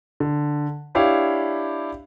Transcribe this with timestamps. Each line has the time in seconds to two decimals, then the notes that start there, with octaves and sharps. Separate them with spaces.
0.20 D3
0.95 D4 E4 G4 C#5 F5